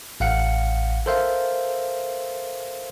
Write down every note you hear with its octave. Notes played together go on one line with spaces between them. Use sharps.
A1 F5 F#5 C#7
A4 A#4 C5 E5 F5